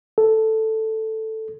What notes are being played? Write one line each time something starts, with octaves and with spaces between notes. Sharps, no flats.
A4